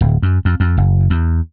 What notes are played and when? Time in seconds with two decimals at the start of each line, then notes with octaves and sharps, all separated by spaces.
0.01 D1
0.22 F#2
0.45 F2
0.60 F2
0.77 F#1
1.10 E2